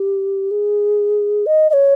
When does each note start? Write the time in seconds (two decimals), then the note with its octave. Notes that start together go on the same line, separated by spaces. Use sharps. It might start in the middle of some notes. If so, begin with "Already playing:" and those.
Already playing: G4
0.51 G#4
1.46 D#5
1.70 D#5
1.73 C#5